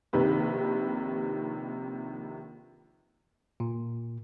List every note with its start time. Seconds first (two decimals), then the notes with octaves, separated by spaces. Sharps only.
0.13 A#1 C3 D#3 B4
3.60 A#2